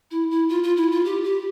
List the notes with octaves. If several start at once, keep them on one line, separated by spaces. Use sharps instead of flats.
E4
E4
F4
F4
E4
F4
G4
G4